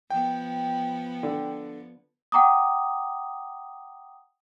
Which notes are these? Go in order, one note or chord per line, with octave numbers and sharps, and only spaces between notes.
F3 B3 G5
D3
F#5 G5 A#5 D6 D#6